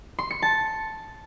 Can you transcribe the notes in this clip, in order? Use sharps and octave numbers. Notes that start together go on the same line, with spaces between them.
C6
C#7
A5